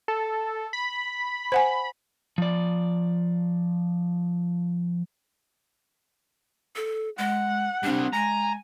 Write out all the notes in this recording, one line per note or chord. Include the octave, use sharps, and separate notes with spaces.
A4
B5
C5 F#5 G#5
F3 D5
A4
G#3 F#5
G3 C4 D4
G#3 G#5 A#5